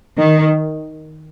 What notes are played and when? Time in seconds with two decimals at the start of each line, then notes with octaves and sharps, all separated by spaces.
0.17 D#3